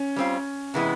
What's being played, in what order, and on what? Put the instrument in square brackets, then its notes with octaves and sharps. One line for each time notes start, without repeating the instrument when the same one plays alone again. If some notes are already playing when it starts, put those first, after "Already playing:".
Already playing: [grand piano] C#4
[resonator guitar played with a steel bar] G3 C4 F4
C3 E3 G#3 B3 E4